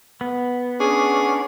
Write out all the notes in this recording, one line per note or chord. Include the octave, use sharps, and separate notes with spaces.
B3
C#4 D4 G#4